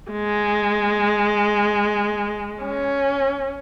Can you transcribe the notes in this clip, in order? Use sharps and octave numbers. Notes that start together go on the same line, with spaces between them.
G#3
C#4